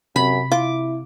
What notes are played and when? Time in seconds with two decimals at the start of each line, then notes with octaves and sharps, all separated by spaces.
0.16 F#2 C3 B5
0.52 E4 F4 D6